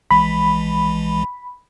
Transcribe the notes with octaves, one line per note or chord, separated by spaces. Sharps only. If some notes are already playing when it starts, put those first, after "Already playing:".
A#1 E3 G#3 B5